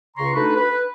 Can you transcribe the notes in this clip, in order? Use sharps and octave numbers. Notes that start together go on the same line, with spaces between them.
C#2 C#3 A#5 C6 C#6
A3 D4 D#4 F#4 B4
B4